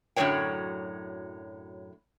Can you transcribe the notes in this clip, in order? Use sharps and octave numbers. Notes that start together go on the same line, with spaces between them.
F#2 A2 D3 F#3 C#5 G5